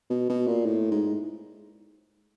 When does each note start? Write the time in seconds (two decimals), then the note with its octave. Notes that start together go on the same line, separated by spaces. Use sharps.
0.10 B2
0.29 B2
0.47 A#2
0.66 A2
0.91 G#2